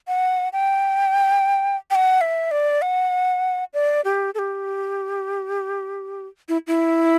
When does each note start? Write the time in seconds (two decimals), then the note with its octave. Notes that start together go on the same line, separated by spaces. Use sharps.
0.08 F#5
0.53 G5
1.91 G5
1.95 F#5
2.21 E5
2.51 D5
2.82 F#5
3.74 D5
4.05 G4
4.35 A4
4.39 G4
6.49 E4
6.67 E4